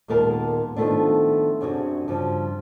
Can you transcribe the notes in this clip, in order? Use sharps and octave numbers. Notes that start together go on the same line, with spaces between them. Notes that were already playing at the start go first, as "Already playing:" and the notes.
D#2 A#2 G#3 B3 A#4 A5
D#3 F3 F#3 A3 B3 D4
F#2 C3 D4 F#4 G#4
G2 C#3 F3